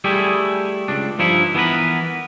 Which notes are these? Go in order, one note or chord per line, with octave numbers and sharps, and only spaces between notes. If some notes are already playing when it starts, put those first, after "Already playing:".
G3 A3 E4 G4 G#4
C#2 D4
G2 F3 D#4 E4
E3 B3 G#4 A#4 B4